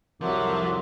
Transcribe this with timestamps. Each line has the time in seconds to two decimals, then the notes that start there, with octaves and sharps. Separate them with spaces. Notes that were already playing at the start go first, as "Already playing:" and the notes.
0.22 C2 F2 F3 F#3 A#4 E5 C6 D6